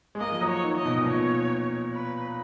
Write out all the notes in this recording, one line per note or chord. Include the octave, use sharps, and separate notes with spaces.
G#3
A#3 D#5
F3
F#3
C#5
D#3
D#5
B2
A#2
B2 C#5
B4